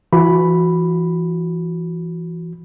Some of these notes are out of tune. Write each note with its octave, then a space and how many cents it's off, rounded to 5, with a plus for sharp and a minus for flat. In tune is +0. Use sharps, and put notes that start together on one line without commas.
E3 +30 F#4 -10 B5 +0